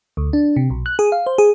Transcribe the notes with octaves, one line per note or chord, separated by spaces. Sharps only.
D2
D4
C3
B1
F#6
G#4
F5
C5
G#4